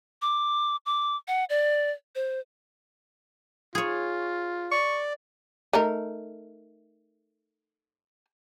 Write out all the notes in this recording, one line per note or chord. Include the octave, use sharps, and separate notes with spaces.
D6
D6
F#5
D5
C5
F4 G#4 C#5
D5 C#6
A3 D#4 A#4